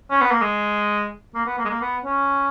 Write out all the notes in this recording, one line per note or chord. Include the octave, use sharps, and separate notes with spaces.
C#4
B3
A#3
G#3
A#3
B3
A#3
G#3
A#3
B3
C#4